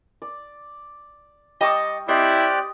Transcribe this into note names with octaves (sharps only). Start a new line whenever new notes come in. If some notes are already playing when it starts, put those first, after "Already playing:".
D5
G3 D#5 A5 C#6 D#6
C4 E4 G4 D5 D#5 F#6